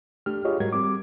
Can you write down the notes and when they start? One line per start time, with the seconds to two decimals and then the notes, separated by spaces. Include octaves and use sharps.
0.26 A3 D4 G4 F6
0.44 F4 G4 G#4 C#5 D#5
0.60 G#2 G3 G#3 F#4 A#4 G#6
0.73 G3 C4 D6